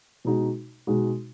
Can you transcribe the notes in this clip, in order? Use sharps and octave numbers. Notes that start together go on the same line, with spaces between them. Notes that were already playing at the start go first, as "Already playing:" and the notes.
B2 G#3 D#4 F#4
B2 G#3 D#4 F#4